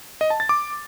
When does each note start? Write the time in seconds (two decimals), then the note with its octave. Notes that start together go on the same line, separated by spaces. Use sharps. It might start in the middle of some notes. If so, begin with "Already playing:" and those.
0.21 D#5
0.30 A5
0.40 A6
0.49 D6